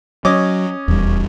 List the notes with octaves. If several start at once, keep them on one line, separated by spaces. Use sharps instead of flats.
F#3 C#4 D#5 D6
D#1 E2 G3